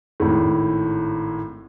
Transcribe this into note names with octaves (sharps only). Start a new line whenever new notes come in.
G#1 A2